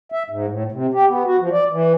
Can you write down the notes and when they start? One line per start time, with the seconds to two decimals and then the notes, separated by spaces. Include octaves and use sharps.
0.12 E5
0.30 G#2
0.47 A2
0.72 C3
0.93 G4
1.08 B3
1.25 F#4
1.40 F3
1.52 D5
1.71 E3